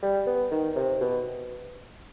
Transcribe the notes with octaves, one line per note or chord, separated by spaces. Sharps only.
G3
B3
D#3
C3
B2